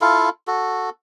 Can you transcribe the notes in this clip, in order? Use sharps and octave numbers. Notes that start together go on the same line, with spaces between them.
E4 F4 A4 F5
F#4 A4